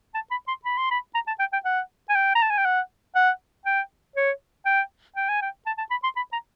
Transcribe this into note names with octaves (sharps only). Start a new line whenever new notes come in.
A5
B5
C6
B5
C6
B5
A#5
A5
G5
G5
F#5
G#5
G5
A#5
A5
G#5
G5
F#5
F#5
G5
C#5
G5
G5
G#5
G5
A5
A5
B5
C6
B5
A#5